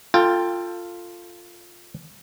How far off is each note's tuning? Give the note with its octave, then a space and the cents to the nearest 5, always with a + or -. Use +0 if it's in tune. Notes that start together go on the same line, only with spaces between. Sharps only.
F4 +0 A4 +20 G5 +15